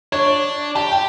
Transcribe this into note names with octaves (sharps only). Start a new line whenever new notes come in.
D4 C#5
G4 A5
G5